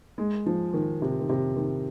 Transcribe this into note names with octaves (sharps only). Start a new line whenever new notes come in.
G#3
F3
D#3
C3
D#3
C3
D#3